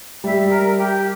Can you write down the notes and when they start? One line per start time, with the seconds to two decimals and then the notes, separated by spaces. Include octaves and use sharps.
0.24 G3 E5
0.50 A#4
0.77 G4